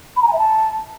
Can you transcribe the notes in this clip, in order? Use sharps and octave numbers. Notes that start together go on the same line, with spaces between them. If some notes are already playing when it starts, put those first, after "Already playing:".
B5
A#5
G#5
E5
A5